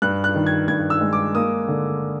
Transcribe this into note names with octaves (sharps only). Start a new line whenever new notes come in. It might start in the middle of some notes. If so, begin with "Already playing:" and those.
G2 F#6
F#6
D#3
G#6
G2 G#6
E6
G#3
D6
A#3 D#6
D3